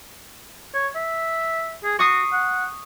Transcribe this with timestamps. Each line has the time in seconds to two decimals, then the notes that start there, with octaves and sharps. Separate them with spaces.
0.74 C#5
0.96 E5
1.84 G#4
1.99 F#4 C#6 D#6 C7
2.33 F#5